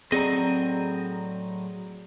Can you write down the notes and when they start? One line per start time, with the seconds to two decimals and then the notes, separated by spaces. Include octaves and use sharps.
0.12 A2 F#3 C4 G#4 D5 D#5 A#5